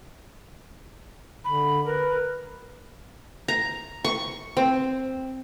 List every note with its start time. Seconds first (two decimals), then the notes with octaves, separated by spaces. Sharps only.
1.44 D3 B5
1.85 A#4 B4
3.48 A#5
4.04 C#6
4.57 C4